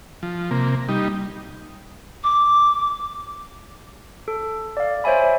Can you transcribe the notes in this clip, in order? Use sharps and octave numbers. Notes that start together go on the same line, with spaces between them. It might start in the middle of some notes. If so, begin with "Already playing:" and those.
F3
C3 A#3
G3 D#4
D6
A4
D5 F5
C5 C#5 E5 G#5 B5